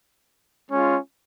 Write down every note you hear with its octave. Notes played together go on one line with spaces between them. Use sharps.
G#3 C#4 F4